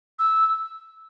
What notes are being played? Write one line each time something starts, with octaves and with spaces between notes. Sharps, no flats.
E6